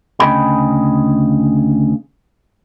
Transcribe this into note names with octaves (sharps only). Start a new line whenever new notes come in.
D2 C#3 G#4 D#5 G5 B5